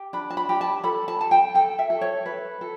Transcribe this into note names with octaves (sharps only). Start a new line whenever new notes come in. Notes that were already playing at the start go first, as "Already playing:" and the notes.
Already playing: G4
D4 B5
A5
B5
G4
A5
A4 B5
A5
A4 A5
G5
A4 G5
E5
A4
C#5
A4 B4
A4